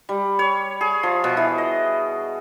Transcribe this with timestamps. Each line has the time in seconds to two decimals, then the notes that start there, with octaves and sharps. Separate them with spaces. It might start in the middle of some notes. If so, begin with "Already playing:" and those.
0.09 G3
0.39 C#5
0.81 G#4
1.03 F3
1.24 B2
1.37 E3
1.58 D#5